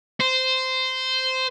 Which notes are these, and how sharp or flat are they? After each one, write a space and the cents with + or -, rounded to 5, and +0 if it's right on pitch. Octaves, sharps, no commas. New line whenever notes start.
C5 -10